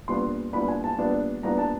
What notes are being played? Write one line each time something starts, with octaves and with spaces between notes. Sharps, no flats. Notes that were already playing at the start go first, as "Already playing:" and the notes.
A#2 G3 B3 D4 C6
A#2 G3 B3 D4 B5
G#5
A5
A#2 G3 B3 D4
A#2 G3 B3 D4 A#5
A5